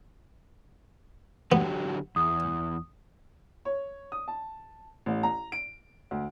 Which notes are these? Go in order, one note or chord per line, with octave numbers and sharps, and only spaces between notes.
D3 F#3 B3 G4
E2 D#6
C#5
D#6
A5
A1
A#5
D7
D2